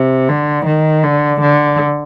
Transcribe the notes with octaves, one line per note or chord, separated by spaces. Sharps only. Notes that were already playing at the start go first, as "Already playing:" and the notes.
Already playing: C3
D3
D#3
D3
D3